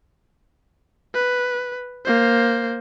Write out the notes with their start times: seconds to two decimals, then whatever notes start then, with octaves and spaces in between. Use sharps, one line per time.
1.14 B4
2.05 A#3 C5